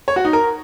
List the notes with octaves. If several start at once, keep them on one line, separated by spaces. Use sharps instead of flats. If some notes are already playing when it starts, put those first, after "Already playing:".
C#5
F#4
D#4
A#4